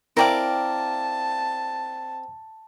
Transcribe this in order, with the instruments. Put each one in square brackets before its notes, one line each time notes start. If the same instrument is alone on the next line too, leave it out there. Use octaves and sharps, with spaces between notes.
[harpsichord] C4 [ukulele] E4 G5 [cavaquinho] A#4 D5 F5 [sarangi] A5